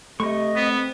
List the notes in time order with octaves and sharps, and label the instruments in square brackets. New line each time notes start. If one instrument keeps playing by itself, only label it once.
[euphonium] C3 [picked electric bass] A3 [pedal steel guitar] D#5 C#6
[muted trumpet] B3 [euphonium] C4